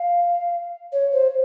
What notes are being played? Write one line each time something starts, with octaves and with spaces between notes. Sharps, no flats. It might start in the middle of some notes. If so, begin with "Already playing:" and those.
Already playing: F5
C#5
C5